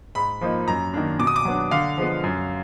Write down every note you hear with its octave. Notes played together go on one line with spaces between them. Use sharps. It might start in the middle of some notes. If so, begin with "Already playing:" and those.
G#2 B5
F3 A#3 D#4
F#2 A#5
D#3 A#3 D4
B2 D6
D#6
D6
F#3 B3 D4
D3 F5
F3 G#3 B3
F#2